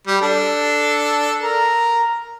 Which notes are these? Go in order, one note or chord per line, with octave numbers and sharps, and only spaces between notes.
G3
D4 A4
A#4